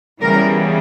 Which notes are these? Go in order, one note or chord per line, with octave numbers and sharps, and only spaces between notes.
E2 C#3 E3 G3 A#4